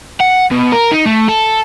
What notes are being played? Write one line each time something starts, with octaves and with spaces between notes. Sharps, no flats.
F#5
B2
A#4
D#4
A3
A4